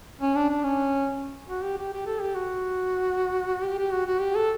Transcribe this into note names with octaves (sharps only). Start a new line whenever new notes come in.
C#4
D4
D4
C#4
F#4
G4
G4
G4
A4
G4
F#4
G4
G4
F#4
F#4
G4
A4